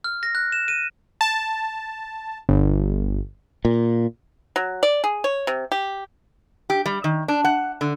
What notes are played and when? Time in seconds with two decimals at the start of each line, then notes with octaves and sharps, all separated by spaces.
0.04 F6
0.23 A#6
0.35 F#6
0.52 E7
0.68 D#7
1.21 A5
2.49 G1
3.65 A#2
4.56 F#3
4.83 D5
5.04 G#4
5.24 C#5
5.47 C3
5.72 G4
6.70 G4
6.86 G3
7.04 D#3
7.28 D4
7.44 F#5
7.81 D3